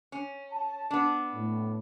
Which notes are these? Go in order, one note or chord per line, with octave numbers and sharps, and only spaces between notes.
C#4
A5
B3 D4
A2